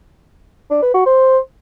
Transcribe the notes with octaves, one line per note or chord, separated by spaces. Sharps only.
D4
B4
F#4
C5